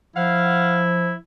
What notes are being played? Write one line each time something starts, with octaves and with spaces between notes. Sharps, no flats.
F3 E4 F5 F#5